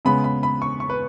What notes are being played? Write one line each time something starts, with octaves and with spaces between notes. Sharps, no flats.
C#3 G#3 B3 B5
B5
B5
C#6
C#6
B4